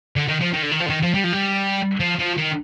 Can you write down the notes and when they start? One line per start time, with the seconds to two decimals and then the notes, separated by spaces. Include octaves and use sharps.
0.16 D3
0.28 D#3
0.41 F3
0.53 D#3
0.62 D3
0.71 D#3
0.80 F3
0.86 D3
0.89 D#3
1.02 F3
1.14 G3
1.24 F3
1.33 G3
2.00 F3
2.19 F3
2.37 D#3